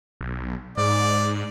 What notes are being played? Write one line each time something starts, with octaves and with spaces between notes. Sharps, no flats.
B1
G#2 D5